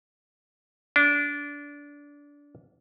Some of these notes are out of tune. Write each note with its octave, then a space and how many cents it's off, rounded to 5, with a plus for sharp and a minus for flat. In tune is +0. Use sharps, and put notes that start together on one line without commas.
D4 -20